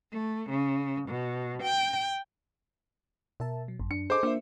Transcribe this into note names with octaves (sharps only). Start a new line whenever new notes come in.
A3
C#3
B2
G5
B2 A#4 E5 A5
F#3
G#1 F#2
D4 C#7
G#4 A4 C5 D#5 D6
A#3 D4 F4 E5